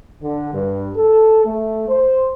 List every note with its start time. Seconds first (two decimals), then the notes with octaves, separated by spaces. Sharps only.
0.22 D3
0.54 G2
0.96 A4
1.45 A3
1.88 C5